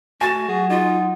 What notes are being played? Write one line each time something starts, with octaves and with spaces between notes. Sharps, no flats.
A3 F#4 G#5 A6 E7
F#3 G#4 F#5
D#4 F4